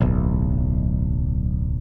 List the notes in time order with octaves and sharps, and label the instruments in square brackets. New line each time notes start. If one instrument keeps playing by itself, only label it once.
[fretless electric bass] D1 B1